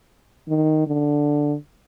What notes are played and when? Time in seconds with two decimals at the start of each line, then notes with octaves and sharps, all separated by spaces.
0.48 D#3
0.87 D3